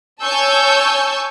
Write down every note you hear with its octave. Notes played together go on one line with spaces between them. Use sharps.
C#5 G#5 A5 C#6 E6 G6